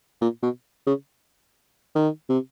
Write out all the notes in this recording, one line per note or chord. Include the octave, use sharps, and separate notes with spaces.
A#2
B2
C#3
D#3
C3